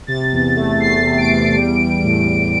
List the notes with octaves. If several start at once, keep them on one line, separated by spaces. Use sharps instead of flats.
C3 A6
E2
A3
E2 C7
C3
D7
E2
G3
G3
A2
A2